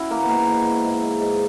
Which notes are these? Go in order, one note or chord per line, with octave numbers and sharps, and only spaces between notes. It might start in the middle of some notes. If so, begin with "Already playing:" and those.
Already playing: C#4 E4 F#4
E3 A#3
B3
G#2 A#3
E3
E3
G#2
G#2
G#2